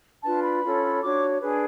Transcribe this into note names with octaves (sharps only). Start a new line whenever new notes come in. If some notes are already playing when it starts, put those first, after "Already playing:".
D4 F4 B4 A5
B5
C#4 F4 A4 C#5
D4 F#4 C#5 D6
D4 G#4 B4